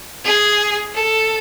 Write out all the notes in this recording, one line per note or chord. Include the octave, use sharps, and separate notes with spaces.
G#4
A4